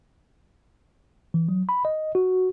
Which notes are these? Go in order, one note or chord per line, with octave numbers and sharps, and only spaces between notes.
E3
F#3
B5
D#5
F#4